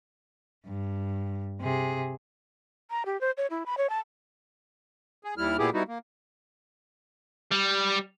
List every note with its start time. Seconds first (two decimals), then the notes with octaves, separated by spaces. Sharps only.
0.66 G2
1.61 C3 G#4
2.91 A#5
3.06 G4
3.21 C5
3.37 C#5
3.50 E4
3.66 B5
3.78 C#5
3.90 A5
5.24 G#4
5.38 D#2 G3 E4 F6
5.58 A#2 B3 E4 G4 G#4
5.73 G3 B3 D#4 E4 F#4
5.88 A#3
7.52 G3